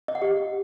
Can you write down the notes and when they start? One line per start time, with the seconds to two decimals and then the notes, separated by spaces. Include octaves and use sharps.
0.08 D#5
0.15 F#5
0.22 G4